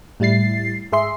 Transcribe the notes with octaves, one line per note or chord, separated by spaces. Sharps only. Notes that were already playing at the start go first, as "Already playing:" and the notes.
A2 G3 E4 A6 C7
G#2 G#4 E5 C6 C7